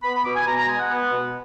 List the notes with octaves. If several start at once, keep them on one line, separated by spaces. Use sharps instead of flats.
B3 B5
B5
B2 D6
G#5
B2 A#5
A#5
G#3 G#5
F#5
B3
B2